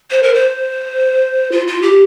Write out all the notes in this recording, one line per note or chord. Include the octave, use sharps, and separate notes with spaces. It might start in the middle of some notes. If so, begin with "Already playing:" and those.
C5
A#4
C5
F4
F4
G4